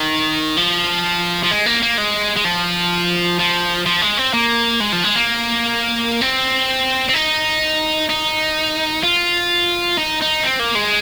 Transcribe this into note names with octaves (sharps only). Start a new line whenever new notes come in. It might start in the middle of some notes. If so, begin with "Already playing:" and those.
Already playing: D#3
F3
F3
G#3
A#3
A#3
G#3
G#3
F3
F3
F3
G#3
C4
A#3
G#3
F3
G#3
A#3
C4
C4
D#4
D#4
F4
D#4
D#4
C4
A#3
G#3